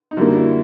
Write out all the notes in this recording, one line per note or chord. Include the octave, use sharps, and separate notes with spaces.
D#4
F#2 D3 G3 A#3 E4
E4